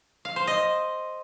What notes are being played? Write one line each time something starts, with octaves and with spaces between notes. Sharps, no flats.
F5
C5
D#5